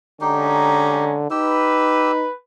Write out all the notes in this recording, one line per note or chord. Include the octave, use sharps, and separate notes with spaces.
D3 G#3 C#4 D#4 G4 A#5
D#4 G4 B4 E6